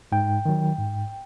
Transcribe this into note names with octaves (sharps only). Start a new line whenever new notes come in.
G#2 G5
D#3 F#3
G#2